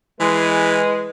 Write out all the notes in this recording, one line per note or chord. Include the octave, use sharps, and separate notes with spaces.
E3 G#3 B4